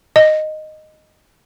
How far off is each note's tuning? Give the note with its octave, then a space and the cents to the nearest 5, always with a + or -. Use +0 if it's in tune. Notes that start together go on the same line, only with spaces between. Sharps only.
D#5 -10